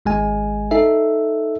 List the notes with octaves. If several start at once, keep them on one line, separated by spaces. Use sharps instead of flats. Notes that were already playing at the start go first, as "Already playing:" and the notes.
G#1 G#3 G#5
D#4 A4 E5